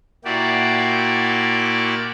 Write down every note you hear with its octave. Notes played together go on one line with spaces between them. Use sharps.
A#2 A#3 E4 F#4 G4 D5